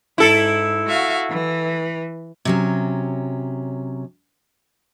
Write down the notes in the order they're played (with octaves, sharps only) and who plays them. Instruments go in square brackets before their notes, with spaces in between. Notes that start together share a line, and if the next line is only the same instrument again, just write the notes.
[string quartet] G#2 [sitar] E4 A4
[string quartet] F#4 E5 F5
E3
[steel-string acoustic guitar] C3 F#3 C#4